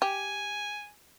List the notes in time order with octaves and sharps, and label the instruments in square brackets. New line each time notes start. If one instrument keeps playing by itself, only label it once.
[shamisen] G4 [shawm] G#5